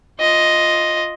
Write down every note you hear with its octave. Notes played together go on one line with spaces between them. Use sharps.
F4 D#5